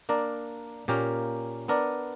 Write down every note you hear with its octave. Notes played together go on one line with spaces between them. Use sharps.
A#3 D4 A#4 D5
A#2 A#3 C#4 G4 A#4
B3 D4 A#4 D5